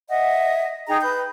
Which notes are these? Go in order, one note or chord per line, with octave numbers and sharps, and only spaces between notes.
D#5 E5 F#5
D#4 G#4 G5 A#5
B4 G6